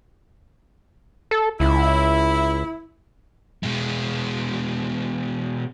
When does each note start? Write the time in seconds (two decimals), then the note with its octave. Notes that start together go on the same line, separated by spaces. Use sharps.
1.31 A4
1.60 C#2 E4
3.63 B2 G#3